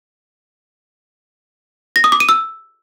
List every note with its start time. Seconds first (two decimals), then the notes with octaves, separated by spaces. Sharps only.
1.96 A#6
2.04 D#6
2.12 D6
2.20 D#7
2.29 E6